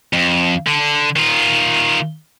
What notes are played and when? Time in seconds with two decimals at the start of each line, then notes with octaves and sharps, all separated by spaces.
0.13 F2
0.67 D3
1.16 D#3 F4